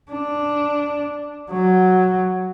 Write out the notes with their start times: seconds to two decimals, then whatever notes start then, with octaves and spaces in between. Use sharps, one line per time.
0.11 D4
1.51 F#3